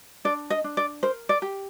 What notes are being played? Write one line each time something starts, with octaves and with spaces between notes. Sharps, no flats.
D4 D5
D#5
D4
D5
A#4 C5
D5
G4